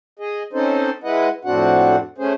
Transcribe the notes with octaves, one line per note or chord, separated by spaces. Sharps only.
G#4 D#5
C4 C#4 D#4 A4 C5
G#3 E4 B4 D#5 F#5
F2 A2 C4 D4 F#4 F#5
A3 C#4 G#4 C5